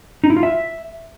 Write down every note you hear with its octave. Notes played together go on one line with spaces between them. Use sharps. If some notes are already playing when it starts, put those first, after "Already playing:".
D#4
E4
F4
E5